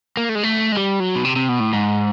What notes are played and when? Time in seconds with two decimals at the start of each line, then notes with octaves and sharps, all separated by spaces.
0.17 A#3
0.29 A3
0.35 G#3
0.43 A3
0.72 G#3
0.77 G3
1.00 F#3
1.15 B2
1.25 C3
1.36 C3
1.49 B2
1.60 A2
1.73 G#2